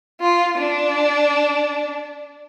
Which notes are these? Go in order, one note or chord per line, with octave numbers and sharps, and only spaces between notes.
F4
D4